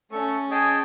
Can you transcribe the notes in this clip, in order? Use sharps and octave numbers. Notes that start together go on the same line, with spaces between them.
A3 C#4 A4 C#6
G#4 D#5 G5 A5